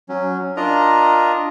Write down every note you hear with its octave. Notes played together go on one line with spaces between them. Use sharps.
F#3 C#4
D4 F4 A#4 D#5 A#5